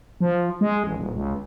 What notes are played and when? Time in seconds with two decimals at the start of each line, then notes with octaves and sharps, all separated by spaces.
0.20 F3
0.61 G#3
0.84 A1
0.96 D#1
1.14 C#2